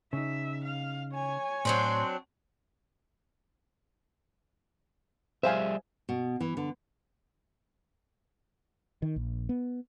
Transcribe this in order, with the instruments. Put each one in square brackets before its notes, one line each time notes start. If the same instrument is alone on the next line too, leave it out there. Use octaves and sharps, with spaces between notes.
[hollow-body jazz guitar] C#3 D#4 [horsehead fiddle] E5
[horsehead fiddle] F5
C#5 G#5
[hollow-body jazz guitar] A2 [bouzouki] F#3 C4 D4 [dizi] C6
[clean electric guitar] G3 G#4 E5 [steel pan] C5 F5 G#5
[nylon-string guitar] B2
E3
D3
[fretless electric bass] D#3
A#1
B3